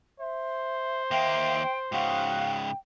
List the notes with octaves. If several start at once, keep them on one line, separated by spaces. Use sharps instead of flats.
C5 E5
D#2 A#3 E5 G5
G#2 C#3 F#4 F5 G5